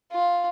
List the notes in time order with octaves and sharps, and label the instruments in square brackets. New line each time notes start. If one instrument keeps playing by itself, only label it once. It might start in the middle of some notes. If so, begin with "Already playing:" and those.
[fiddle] F4